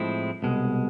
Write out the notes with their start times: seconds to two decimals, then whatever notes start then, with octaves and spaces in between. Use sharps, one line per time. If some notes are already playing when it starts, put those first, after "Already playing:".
Already playing: A2 F3 G#3 C4 E4
0.42 C2 B2 G#3